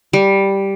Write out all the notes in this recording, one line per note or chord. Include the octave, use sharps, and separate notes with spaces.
G3